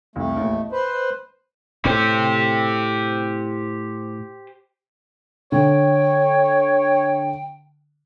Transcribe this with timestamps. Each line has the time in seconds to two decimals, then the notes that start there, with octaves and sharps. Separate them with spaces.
0.16 C2 F2 A3
0.37 A1 E2 A#2
0.52 D#5
0.72 B4 C5
1.85 A2 G4 C5
5.52 D3 C#5 G5